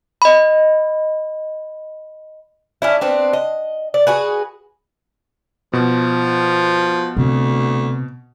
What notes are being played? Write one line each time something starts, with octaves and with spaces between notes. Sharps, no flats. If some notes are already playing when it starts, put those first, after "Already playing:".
D#5 B5
C#4 D4 E4
B3 C4 D4
D#5
D5
F#4 G#4 B4
B2 F3
D2 C3